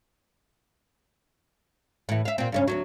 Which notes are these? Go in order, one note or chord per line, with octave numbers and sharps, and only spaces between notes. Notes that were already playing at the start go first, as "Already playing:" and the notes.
A2 E3
E5 F5
A#2 C4
G2 C#3 C#4
D2 G2 F#3